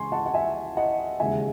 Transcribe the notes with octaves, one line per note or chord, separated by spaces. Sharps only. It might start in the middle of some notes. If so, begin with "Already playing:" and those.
Already playing: C#2 C#3 E3 G#3 G#5 C6 C#6
F#5 A5
F#5
E5 G#5
D#5 F#5
E1 D#2 C#3 G#3 E5 G#5